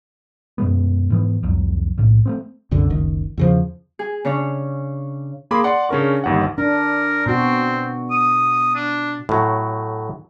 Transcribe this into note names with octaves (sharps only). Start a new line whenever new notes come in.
F#2 B2 G#3 B3
G#2 E3 B3
C2 F2 F#3
B1 A2
A3 B3 C4
C2 F#2 D3
F#1 C#2 D#3
E2 C#3 F3
G#4
C#3 D4 C#5
A#3 G#4 B5 C6 D6
D5 F#5 C6
C#3 C#4 D4 A#4 C#6
G1 D#2 F#5
D4 A#4
B2 C4 F#4
D#6
D4
A2 F#3